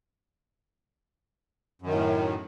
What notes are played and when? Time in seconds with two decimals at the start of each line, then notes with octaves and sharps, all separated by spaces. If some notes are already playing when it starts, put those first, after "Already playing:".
1.82 F#2
1.86 D#3
1.91 A2